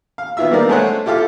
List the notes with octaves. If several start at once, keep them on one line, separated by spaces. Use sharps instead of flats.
F5
D#3 B3 E4 F4 E5 E6
G3 A#3 B3 D#4 A#4 D5
G#3 A3 G#4 C5 C#5 F#5
E4 F4 G4 A4 F5